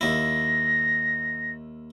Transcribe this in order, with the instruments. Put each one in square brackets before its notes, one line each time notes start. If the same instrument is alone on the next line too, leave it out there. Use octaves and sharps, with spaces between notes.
[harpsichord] D#2 E4 [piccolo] A#6